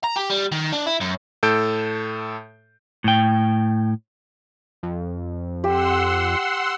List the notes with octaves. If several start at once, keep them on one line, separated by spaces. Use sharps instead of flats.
A#5
G4
G3
D#3
D4
E4
F#2
A2 A4 A5 E6 G6 D7
A2 G5
F2
G4 F#5 C6 E6